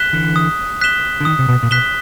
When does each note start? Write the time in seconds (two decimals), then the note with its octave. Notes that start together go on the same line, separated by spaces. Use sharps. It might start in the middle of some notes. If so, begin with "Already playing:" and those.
Already playing: F#6 B6 E7 G7
0.13 D3 E3
0.36 D#6
0.81 F#6 B6 E7 G7
1.20 D3
1.25 D#3 D#6
1.39 C3
1.48 B2
1.63 A#2
1.71 B2 F#6 B6 E7 G7